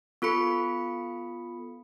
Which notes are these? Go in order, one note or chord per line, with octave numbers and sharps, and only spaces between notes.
B3 F4 A4 B5 C#7